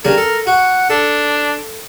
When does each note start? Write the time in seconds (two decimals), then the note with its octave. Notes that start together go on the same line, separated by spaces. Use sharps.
0.05 C#3 G3 D4 A#4
0.17 A4
0.47 F#4 F#5
0.90 D4 A4